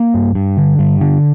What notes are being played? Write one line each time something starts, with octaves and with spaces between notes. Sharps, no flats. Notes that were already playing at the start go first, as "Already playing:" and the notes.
Already playing: A#3
G2
G2
D3
G2
D3